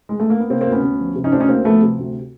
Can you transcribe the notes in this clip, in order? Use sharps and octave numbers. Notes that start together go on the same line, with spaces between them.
G#3
A3
A#3
B3
C3 A#3 C4
A#3 C4
D2
B3 C#4
D2
F3
C3
C#4 D#4
D2 C4 D4
C#4 D#4
D2 A#3 C4
F3 A3 B3
C3
D2